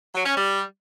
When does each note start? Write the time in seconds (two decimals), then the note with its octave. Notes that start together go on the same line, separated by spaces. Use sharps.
0.15 F#3
0.25 C#4
0.35 G3